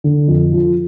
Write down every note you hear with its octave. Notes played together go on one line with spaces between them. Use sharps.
D3
F2
F3